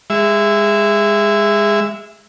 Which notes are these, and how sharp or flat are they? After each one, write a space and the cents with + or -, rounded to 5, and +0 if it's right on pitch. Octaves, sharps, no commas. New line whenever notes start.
G#3 -20 E5 +0